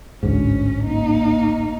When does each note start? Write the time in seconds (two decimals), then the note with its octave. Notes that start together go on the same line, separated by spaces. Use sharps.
0.23 A1 D2 G#2 C#4
0.84 A#3 D#4